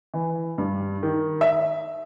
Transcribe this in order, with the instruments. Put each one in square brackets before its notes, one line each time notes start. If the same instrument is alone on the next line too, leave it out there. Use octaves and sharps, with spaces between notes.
[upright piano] E3
G2
D#3
E5